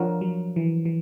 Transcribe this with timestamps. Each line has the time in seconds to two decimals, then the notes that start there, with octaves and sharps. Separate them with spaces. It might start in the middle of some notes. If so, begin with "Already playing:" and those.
Already playing: F3 D4 F4 A#4 C#5 F#5
0.21 F#3
0.56 E3
0.85 E3